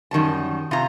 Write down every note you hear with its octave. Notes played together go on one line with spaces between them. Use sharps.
F#2 D#3 G3 A5
C3 F4 A#5